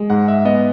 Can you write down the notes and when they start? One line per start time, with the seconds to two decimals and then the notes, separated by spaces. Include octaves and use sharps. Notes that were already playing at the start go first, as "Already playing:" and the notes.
Already playing: G#3
0.10 G#2 F#5
0.28 E5
0.45 B3 D#5